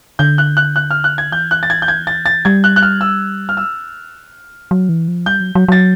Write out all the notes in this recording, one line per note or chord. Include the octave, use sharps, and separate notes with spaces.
D3 G6
F#6
F#6
F#6
F6
F#6
G#6
E3 G6
F#6
A6
G#6
G6
G#6
A6
A6
G3 G#6
F#6
F#6
F6
E6
F6
E6
F#3
E3
F3
G3 G6
F#3
F#3
F#3 A6